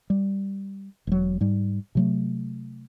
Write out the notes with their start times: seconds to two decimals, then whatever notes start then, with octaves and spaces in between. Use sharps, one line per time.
0.10 G3
1.07 E1 F#3
1.41 G#2 G3
1.95 C3 F#3 A3